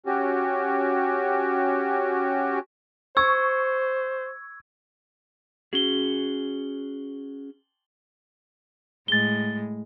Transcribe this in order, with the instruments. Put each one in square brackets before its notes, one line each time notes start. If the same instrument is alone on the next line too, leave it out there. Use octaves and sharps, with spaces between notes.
[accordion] C#4 F#4 G4
[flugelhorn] C5 [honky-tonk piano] C#6 [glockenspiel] E6 G#6
[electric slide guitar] C#4 F#4 G#4 [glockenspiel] F#7 G7
[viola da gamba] A2 G#3 [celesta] A6 G7